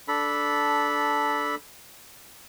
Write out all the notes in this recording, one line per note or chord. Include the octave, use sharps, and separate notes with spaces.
D4 A4 B5